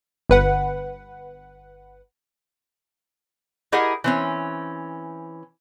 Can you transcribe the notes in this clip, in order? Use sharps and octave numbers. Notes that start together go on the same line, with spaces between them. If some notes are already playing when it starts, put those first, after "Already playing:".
G1 B4 F#5
E4 G4 G#4 A#4 D#5 F#5
E3 C4 C#4